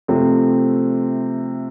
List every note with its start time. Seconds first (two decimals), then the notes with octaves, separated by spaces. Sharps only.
0.08 C3 F3 A3 C4